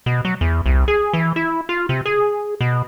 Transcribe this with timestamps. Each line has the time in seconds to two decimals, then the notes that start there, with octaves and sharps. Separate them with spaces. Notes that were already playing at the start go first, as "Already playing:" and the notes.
0.06 B2
0.25 F#3
0.41 E2
0.66 C2
0.88 G#4
1.14 E3
1.36 E4
1.69 F4
1.89 C3
2.06 G#4
2.61 B2